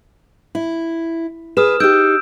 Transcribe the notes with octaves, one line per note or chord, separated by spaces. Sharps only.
E4
G#4 B4 D#6 F6 E7
D#4 G4 E6 G6 D7